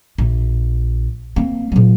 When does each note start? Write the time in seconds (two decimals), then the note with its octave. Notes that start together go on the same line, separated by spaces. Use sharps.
0.18 A#1
1.36 A#3 C4
1.72 A#2 F#3